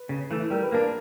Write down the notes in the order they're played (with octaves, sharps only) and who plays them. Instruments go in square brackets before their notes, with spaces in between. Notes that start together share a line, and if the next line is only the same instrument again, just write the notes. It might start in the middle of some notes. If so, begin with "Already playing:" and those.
Already playing: [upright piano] B4
[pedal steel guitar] C#3
E3 A3
[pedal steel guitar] G3 [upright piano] A#4
[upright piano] B4
[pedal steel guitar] A#3 D4 [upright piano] A#4